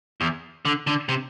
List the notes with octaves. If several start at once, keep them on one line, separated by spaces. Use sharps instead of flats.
E2
D3
D3
C3